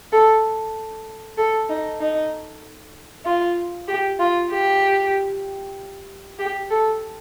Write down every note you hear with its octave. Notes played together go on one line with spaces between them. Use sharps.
A4
A4
D#4
D#4
F4
G4
F4
G4
G4
A4